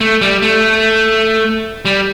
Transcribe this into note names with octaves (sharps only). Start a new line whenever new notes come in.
A3
G3
A3
G3